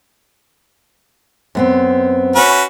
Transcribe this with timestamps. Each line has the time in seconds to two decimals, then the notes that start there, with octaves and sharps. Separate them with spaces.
1.55 F#2 B3 C4
2.36 C#4 F#4 B4